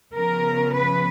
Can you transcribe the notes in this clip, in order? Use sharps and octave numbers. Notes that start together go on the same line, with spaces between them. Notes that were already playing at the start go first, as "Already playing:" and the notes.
C#3 F3 B3 A#4
B4